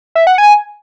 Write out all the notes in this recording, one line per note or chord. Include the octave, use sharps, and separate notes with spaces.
E5
F#5
G#5